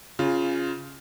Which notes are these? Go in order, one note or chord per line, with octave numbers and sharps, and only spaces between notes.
C#3 F4